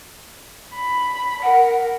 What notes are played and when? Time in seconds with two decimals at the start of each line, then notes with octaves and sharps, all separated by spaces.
0.74 B5
1.43 A#4 F#5